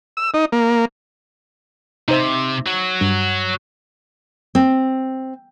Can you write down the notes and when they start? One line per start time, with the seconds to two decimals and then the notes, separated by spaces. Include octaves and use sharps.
0.17 E6
0.34 D#4
0.52 A#3
2.08 C3 D#4 C5 E5
2.66 F#3 F#4
3.01 G2
4.55 C4